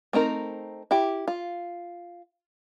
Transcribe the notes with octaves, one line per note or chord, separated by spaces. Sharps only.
A3 C4 D#4 A#4
E4 G4
F4